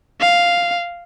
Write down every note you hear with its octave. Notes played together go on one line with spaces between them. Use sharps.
F5